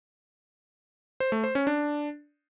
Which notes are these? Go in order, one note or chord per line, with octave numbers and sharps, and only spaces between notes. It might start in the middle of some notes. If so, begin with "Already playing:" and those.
C5
A3
C5
C#4
D4